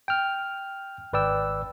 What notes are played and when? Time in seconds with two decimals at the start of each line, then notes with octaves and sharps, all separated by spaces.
0.08 G5 F6
1.13 G#1 B4 D5 G5 E6